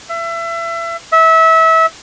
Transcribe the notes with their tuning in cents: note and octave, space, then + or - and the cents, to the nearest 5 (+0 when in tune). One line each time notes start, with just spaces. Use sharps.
E5 +30
E5 -25